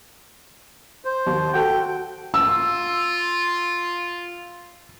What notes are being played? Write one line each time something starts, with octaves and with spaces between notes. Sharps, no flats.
C5
D#2
F#4 A4 G5
F4 E6